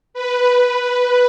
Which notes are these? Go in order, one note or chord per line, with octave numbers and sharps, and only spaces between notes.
B4